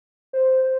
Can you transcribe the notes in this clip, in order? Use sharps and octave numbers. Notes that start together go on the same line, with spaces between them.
C5
C5